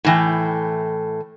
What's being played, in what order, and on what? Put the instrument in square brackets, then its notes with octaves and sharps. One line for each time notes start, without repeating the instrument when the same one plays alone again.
[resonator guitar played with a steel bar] A2 E3 G5